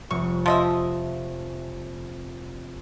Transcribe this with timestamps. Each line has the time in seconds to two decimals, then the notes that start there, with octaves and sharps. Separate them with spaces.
0.11 F1 C#6
0.46 F3 D#5 E5